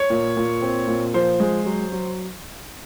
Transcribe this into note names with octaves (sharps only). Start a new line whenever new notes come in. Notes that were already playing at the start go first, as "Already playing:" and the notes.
Already playing: C#5
A#2
A#2
C4
A#2
F3 C5
G#3
F#3
F#3